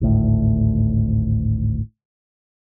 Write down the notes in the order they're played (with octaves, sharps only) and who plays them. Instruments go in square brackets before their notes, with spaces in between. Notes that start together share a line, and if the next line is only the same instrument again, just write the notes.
[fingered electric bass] G#1 D2 A2